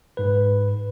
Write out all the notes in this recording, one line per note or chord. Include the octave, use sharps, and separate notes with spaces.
G#2 B4